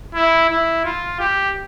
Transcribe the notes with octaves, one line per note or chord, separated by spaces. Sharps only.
E4
E4
F4
G4